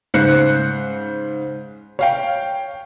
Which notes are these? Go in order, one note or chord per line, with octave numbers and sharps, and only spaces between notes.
G#2 C#3 C5 F#6 C#7
C#5 F5 G5